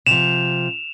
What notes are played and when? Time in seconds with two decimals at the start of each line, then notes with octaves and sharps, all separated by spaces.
0.07 C3 F3 E7 F7